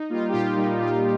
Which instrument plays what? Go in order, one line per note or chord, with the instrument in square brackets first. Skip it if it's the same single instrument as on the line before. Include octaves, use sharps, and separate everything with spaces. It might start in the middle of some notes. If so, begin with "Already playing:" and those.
Already playing: [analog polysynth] D#4
G3 A#3 F4
G4
A#2 F4
G3 A#3 D#4
A#2 F4